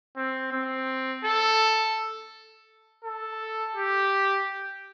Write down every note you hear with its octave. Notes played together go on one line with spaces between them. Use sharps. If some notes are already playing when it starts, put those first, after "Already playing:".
C4
C4
A4
A4
G4